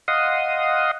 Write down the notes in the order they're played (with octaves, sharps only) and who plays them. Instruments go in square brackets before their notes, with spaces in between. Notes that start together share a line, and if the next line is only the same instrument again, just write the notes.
[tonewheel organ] D#5 F5 F#5 C6 D#6